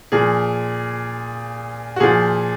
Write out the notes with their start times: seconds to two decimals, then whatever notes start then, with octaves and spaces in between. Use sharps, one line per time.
0.12 A#2 F3 G#4
1.96 F#4
2.00 A#2 F3 G#4